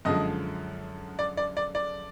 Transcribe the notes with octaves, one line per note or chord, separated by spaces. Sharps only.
F#2 D3 F3 G#3 D#5
D5
D5
D5
D5